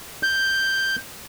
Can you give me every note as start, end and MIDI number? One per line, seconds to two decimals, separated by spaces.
0.23 0.96 91